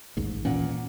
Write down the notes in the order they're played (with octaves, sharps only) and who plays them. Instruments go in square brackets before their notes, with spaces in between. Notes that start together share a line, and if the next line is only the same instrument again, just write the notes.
[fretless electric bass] A1 D#2 G#2
[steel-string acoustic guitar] A#2 F#5 [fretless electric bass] E3 C#4